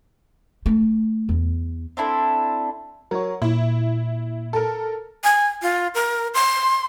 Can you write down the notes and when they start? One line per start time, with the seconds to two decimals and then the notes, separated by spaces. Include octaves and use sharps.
0.66 A3
1.29 E2
1.97 C4 D4 E4 A4
3.11 F#3 A#4 C#5
3.42 A#2 E4
4.53 A4 A#4
5.24 G#5
5.62 F4
5.95 A#4
6.34 C6